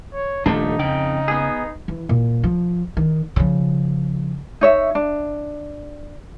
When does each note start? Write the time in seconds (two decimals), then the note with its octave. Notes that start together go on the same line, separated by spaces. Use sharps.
0.14 C#5
0.46 D#1 F3 A3 D4 D#4
0.79 F2 C#3 G5
1.28 B3 G#4
1.88 E3
2.09 A#2
2.44 F3
2.97 D#3
3.36 C#3 F3
4.61 D#4 C#5 E5
4.95 D4